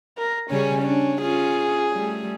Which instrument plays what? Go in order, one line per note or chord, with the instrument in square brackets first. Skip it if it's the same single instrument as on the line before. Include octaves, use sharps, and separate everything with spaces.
[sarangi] A#4
[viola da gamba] C#3 G3 G#4 [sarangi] C#4
[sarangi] C#4 [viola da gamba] D4
[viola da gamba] C#4 F4 [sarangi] G#4
[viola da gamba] G3 A3